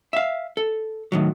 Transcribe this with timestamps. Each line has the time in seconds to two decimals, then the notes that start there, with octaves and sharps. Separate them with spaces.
0.13 E5 F5
0.57 A4
1.12 A2 D#3 F#3